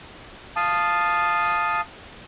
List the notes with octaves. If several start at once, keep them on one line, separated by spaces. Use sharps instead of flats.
F5 A5 D#6